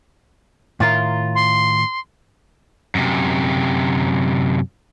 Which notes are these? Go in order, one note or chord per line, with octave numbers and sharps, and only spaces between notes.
A2 D#3 F4 A#4
C6
F#2 C3